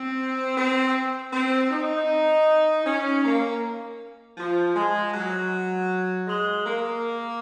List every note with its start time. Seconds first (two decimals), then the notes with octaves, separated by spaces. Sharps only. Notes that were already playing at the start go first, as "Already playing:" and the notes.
Already playing: C4
0.57 C4
1.33 C4
1.71 D#4
2.86 C#4
3.24 A#3
4.38 F3
4.76 G#3
5.14 F#3
6.28 G#3
6.65 A#3